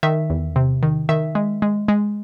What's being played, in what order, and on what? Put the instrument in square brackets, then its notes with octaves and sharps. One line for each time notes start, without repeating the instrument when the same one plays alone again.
[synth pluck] D#3 E5
E2
C3
D#3
D#3 E5
G#3
G#3
G#3